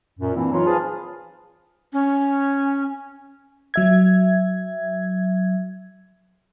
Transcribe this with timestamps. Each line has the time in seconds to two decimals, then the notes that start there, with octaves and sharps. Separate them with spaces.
0.19 F#2 A#2
0.36 E3 A#3 C4 D4 E4
0.52 E3 F#3 D#4 F4
0.66 G#4 B4 C5 F5 A5
1.93 C#4
3.74 F#3 E5 G#6